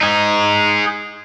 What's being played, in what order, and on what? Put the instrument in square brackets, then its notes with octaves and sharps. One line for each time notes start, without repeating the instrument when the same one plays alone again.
[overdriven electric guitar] D#4 G#4